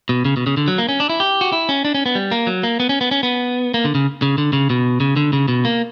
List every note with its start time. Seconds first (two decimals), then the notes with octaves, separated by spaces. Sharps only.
0.09 B2
0.25 C#3
0.37 B2
0.47 C#3
0.57 D3
0.68 F#3
0.78 A#3
0.89 C#4
1.00 D4
1.09 E4
1.20 G4
1.41 F#4
1.52 E4
1.69 C#4
1.85 D4
1.95 C#4
2.06 B3
2.15 G3
2.31 A#3
2.47 F#3
2.63 A#3
2.80 B3
2.89 C#4
3.01 B3
3.11 C#4
3.23 B3
3.74 A#3
3.85 D3
3.95 C#3
4.22 C#3
4.38 D3
4.53 C#3
4.70 B2
5.00 C#3
5.16 D3
5.33 C#3
5.48 B2
5.65 A#3